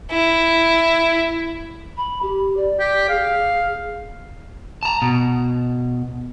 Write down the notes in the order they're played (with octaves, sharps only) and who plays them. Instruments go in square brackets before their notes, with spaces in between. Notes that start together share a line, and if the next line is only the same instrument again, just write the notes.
[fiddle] E4
[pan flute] B5
G4
D5
[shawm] G4
[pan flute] G#4 [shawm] F5
[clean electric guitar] A5 A#5
B2